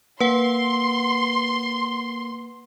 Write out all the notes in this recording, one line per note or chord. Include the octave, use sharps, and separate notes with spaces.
A#3 B4 F#5 C6